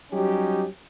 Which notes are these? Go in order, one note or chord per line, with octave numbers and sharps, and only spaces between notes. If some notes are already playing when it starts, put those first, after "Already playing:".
F#3 G3 C#4 D#4 G4